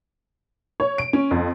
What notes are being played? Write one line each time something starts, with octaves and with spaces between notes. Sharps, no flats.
C#5
D7
C#4
F2